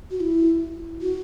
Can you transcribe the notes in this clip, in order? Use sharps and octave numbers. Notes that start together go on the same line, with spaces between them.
F#4
E4
F#4